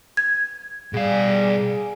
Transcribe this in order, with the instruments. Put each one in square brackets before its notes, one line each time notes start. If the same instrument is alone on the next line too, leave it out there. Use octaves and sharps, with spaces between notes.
[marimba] G#6
[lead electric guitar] B2 F5 [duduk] G3 [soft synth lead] G#4